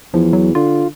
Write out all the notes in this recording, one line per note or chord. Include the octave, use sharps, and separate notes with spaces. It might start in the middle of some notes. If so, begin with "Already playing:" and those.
E2 F3
F#3
D3 F4